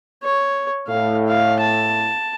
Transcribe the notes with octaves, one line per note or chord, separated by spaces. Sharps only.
C#5
A2 F5
F5
A5